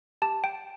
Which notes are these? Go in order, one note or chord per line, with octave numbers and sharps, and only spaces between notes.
G4 A5
G5